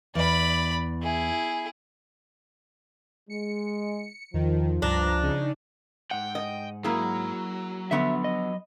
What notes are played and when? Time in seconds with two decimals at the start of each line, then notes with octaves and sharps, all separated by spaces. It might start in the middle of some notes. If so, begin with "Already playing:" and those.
0.15 E2 D5 B5
1.02 E4 G#4
3.30 G#3 C#7
4.34 E2 D#3 F3
4.82 C#2 G2 D4 A5 A#5
5.22 C#3 D#4
6.11 G#2 F#5 G5
6.35 D#5
6.84 F#3 A#3 E4 G#4
7.91 D3 F3 B3 E5
8.24 D#5